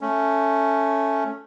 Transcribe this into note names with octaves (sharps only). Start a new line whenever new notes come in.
A3 C#4